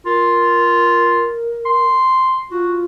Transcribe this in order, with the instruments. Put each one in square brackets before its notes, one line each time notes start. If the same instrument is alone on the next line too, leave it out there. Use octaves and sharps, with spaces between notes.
[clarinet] F4 [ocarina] A#4
[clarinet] C6
[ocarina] F4 [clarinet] F#4